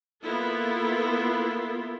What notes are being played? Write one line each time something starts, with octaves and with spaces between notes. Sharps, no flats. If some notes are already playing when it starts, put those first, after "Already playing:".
A#3 B3 E4 F4 A4